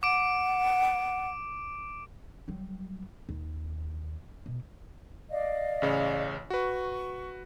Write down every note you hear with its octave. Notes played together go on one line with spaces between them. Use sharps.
F#5 D6 D7
F#3 G3
D#2
B2
D5 D#5 F5
A1 C#3 C#5
F#4 B4 C#6